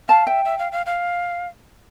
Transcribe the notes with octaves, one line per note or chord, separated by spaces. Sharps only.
F5 A5
E5 G5
E5
F5
F5
F5